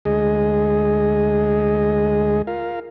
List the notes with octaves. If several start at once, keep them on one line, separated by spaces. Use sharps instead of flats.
D2 G#3 G#4 D#5
F4 A#4 F5